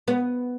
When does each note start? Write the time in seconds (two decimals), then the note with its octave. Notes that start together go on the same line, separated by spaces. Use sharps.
0.08 B3